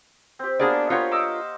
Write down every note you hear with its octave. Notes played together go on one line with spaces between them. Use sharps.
C4 G4
A#3 B3 D4 F#4 G#4 D5
F4 G4 A#4 C5 C#5 F#5
D#5 D6 E6